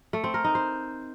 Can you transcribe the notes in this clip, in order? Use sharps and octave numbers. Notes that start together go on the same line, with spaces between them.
A3
C4
A#4
D#4
C5